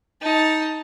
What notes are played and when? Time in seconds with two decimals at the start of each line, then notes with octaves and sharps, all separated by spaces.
0.22 D#4 A5